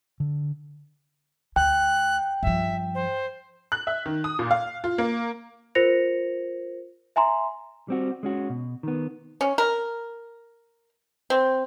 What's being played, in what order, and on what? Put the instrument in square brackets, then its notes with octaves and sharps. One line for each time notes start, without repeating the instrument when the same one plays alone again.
[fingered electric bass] D3
[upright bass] D2 [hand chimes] G5 [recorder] F#6
[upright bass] G2 F3 [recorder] E5
[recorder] C5
[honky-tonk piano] F#6
E5
D#3
D#6
A#2
F5
F4
A#3
[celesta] F4 A#4 C5 A#6 C#7 F7
E5 G#5 A#5 C6
[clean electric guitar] G3 C4 F#4
G#3 C#4 F#4
B2
D#3 B3
[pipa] C#4
A#4
C4